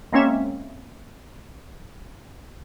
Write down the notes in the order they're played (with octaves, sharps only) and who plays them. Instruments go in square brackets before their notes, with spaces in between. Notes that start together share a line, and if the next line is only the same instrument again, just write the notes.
[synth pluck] G#3 A#3 C4 C#4 C#5 E5